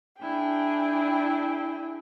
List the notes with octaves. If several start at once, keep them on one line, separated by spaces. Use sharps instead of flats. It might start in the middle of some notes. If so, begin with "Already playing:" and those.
D4 E4 G#4 G5